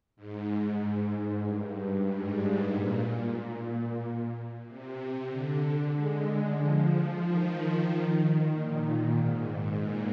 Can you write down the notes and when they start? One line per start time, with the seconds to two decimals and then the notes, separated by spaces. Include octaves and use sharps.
0.16 G#2
0.48 G#2
0.81 G#2
1.44 G2
2.09 G#2
2.73 A#2
4.67 C3
5.30 D3
5.94 G#3
6.60 F3
7.24 D#3
8.52 A#2
9.16 G#2
9.49 G#2
9.82 A#2